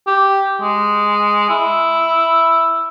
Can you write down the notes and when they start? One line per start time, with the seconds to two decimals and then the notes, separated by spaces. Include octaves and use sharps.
0.07 G4
0.61 G#3
1.49 E4